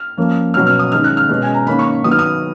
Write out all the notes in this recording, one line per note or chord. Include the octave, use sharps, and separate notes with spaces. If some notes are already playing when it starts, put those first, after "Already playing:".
Already playing: F6
F3 A#3 C#4
B2 F#3 C#4 F6
F6
D#6
D#3 G#3 C#4 F6
F#6
F6
B2 G#3 C#4
G#5
A#5
D#3 A#3 C#4 B5
C#6
D#3 F#3 B3 D#6
F6
D#6